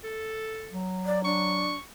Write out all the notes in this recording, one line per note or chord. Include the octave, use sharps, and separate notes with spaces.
A4
F#3
D5
D4 C#6